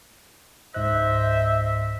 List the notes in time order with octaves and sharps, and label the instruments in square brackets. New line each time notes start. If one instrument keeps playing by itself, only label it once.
[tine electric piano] C#2 G#2 F#6 [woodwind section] C5 D#5 E5